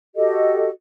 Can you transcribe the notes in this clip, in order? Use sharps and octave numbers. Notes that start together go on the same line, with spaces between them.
F#4 G4 A4 D#5